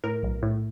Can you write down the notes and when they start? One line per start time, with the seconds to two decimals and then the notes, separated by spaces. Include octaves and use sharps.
0.04 A2 A#4
0.23 B1
0.43 A2